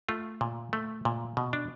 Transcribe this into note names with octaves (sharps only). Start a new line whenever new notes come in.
A3 F4
A#2
A3
A#2
B2
D4